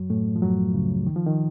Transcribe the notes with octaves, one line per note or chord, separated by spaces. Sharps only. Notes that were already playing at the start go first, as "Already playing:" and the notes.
Already playing: F#2 F#3
A2 A3
F3
F#2 F#3
C#2 C#3
D#3
F3
D#3